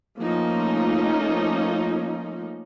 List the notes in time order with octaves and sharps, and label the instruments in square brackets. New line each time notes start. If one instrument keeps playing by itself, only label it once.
[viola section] F3 A3 A#3 C#4 D#4